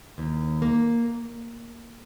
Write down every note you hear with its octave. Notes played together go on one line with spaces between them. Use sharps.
D#2
A#3